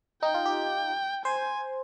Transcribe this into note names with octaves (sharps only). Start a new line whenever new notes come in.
D#4 G5
F4
G4
C5 G#5